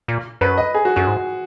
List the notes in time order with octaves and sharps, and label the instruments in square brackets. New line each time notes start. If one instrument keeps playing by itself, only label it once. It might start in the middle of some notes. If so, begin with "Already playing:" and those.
[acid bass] A#2
[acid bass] F#2 [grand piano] B4
[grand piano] D#5
G#4
F#4
[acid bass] F#2 [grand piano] F#4
[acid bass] G#2